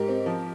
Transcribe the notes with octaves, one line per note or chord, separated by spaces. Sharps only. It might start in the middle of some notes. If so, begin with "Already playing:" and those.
Already playing: G#2 G4 A#4
C4
F3